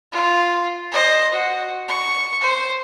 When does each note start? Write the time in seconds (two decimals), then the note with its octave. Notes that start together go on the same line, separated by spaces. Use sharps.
0.12 F4
0.92 C5 D#5
1.33 F#4
1.88 C#6
2.41 C5